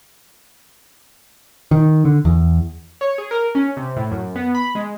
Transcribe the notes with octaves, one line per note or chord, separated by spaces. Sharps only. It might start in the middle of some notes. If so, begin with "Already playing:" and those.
D#3
D3
E2
C#5
G#4
A#4
C#4
C3
A2
F#2
B3
B5
G#3